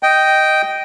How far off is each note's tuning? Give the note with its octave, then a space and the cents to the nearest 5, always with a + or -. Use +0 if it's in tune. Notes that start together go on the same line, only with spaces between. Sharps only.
D#5 +0 G5 -10